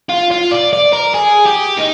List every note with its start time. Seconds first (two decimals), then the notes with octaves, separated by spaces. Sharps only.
0.10 F4
0.31 F4
0.51 D5
0.73 D5
0.93 A#4
1.14 G#4
1.46 G4
1.77 D#4